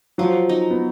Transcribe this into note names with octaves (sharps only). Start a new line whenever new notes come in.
F3 F#3
D#4
B3